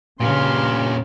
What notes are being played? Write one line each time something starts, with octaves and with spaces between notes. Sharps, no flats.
G2 A#2 C#3 C#4 F5 C6